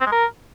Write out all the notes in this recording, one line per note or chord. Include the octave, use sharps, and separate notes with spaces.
C4
G#3
A#4